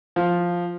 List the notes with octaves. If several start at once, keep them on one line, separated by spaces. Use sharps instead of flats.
F3